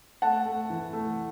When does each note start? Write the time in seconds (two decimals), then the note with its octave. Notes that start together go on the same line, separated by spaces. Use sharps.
0.22 A3 F#5 A5
0.46 A3
0.70 E3
0.93 A3